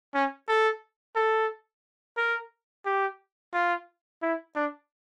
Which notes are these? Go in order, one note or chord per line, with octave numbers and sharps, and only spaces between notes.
C#4
A4
A4
A#4
G4
F4
E4
D4